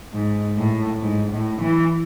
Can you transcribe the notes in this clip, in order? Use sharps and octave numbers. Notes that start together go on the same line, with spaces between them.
G#2
A2
G#2
A2
E3